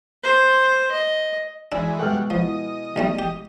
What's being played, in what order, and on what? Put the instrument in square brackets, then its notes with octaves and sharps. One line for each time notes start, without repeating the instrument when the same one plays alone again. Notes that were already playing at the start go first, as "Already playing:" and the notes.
[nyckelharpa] C5
D#5
[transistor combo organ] E3 G#3 [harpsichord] D4 [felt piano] E6
[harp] B2 G#3 C#6 [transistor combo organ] G3 F#5 [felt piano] A4 E5 F6
[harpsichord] F3 [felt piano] B3 E4 [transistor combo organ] D#5
[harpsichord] B1 G3 A3
G4